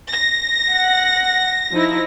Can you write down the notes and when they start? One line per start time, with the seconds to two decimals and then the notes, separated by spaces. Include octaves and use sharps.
0.11 A#6
0.72 F#5
1.72 F3 D#4 E4